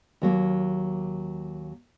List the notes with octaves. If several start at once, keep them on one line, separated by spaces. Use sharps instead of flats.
D#2 F#3 A#3